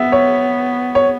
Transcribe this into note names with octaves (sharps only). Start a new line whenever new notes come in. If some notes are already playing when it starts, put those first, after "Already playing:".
Already playing: B3 E5
C#5
C#5